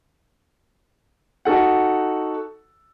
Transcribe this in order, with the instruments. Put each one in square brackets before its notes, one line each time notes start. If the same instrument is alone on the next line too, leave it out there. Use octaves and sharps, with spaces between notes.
[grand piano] D#4 F#4 A4 F#5